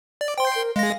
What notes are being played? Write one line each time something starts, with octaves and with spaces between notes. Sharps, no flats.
D5
C5 G5 C6
A#4
G#3 F5 A#6